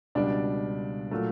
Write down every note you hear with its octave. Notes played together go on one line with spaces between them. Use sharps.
C#2 B2 G3 D4 D5
A#2 F#3 A3